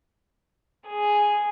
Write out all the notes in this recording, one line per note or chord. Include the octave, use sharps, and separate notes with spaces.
G#4